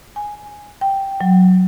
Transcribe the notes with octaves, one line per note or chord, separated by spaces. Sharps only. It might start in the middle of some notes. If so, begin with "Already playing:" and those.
G#5
G5
F#3